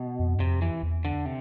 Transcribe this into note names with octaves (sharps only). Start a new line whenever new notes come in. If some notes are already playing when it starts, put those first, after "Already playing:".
Already playing: B2
F2
G2
F2 C3
E3
E2
D3
C3